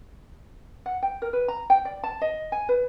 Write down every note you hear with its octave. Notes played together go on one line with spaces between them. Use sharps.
F#5
G5
A#4
B4
A#5
G5
D5
A5
D#5
G#5
B4